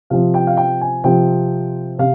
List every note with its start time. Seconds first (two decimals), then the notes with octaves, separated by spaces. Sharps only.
0.10 C3 F3 C4 F5
0.34 G5
0.47 F5
0.57 G5
0.81 G#5
1.04 C3 F3 C4 G5
1.99 C3 F5